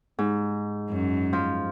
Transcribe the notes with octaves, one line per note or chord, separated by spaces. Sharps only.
G#2
F#2
F3